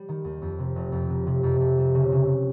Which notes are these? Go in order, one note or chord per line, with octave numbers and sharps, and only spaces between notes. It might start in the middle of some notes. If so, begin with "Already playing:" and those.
Already playing: G3
D#3
D#2
F2
C3
F1
F2
C3
C3
F2
F2
G3
C#3
C#3